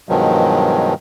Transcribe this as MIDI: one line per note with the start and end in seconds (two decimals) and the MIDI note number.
0.09 0.94 43
0.09 0.94 47
0.09 0.94 51
0.09 0.94 53
0.09 0.94 54
0.09 0.94 56